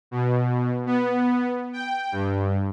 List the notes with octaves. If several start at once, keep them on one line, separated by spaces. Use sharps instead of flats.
B2
B3
G5
G2